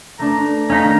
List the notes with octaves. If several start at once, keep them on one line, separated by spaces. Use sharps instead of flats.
A3 D4 A#5
C#4 D#4 F5 A#5 A#6 B6
D#3